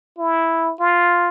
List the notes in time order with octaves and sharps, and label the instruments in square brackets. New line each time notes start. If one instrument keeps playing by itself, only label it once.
[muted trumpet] E4
F4